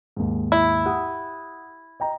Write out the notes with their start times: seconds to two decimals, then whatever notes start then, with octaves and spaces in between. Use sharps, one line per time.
0.17 D#2 G#2
0.52 E4
0.86 G4 F#5 D#6
2.00 D#5 G5 A#5